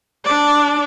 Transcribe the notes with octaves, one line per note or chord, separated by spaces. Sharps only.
D4 D5